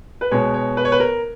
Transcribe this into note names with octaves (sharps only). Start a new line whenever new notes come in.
B4
B2 G#3 B3 C#5
C#5
B4
C#5
B4
A#4